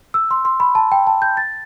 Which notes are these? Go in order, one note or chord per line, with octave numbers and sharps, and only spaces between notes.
E6
C6
C6
B5
A5
G5
A5
G6
A6